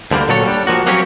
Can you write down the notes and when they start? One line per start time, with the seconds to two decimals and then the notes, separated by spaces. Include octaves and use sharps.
0.11 D2 D3 G3 A#3
0.28 A#2 F#3 A4 C#5
0.44 G3 D4
0.67 F3 A#3 F#4
0.86 F#3 A#3 C4 C#4 G4 C#5